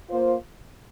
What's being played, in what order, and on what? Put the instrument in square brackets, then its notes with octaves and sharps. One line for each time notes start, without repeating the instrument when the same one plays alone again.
[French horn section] A#3 F4 C5